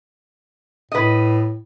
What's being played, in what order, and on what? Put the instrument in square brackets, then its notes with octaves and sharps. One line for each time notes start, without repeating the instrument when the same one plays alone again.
[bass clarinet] A2 [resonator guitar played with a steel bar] B4 D#5